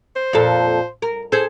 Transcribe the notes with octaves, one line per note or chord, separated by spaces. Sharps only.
C5
F2 A#2 A4
A#4
G#4 A4 C5